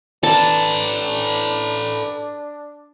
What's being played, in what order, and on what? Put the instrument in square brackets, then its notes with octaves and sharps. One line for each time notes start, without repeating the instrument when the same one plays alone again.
[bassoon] D4 [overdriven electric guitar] A4 B4 [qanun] A5